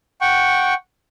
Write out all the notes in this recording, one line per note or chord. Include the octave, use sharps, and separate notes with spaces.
F#5 G5 C#6